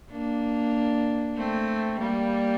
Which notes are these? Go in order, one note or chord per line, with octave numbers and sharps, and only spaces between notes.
A#3 D4
A3 C4
G3 A#3